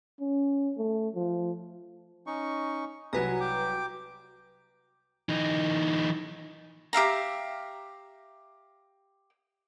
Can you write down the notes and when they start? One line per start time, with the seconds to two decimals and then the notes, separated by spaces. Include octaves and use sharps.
0.20 C#4
0.77 A3
1.15 F3
2.27 C#4 D#4 C#6
3.13 C2 F#3 F#4 B4 G#5 A#5
3.40 G5 D6
5.29 E3 D#4
6.93 G4 E5 F5 A#5